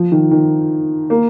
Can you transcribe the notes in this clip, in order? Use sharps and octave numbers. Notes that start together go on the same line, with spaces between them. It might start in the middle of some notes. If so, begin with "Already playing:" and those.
Already playing: F3
D#3
D#3
A#3